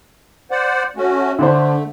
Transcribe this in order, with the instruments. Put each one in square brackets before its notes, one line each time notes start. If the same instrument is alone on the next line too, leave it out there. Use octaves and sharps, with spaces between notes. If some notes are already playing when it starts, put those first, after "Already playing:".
[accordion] C5 D5 F#5
A3 C#4 F#4
[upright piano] D3 D4 C5 [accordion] A3